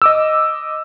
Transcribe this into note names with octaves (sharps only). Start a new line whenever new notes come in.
D#5 D6 E6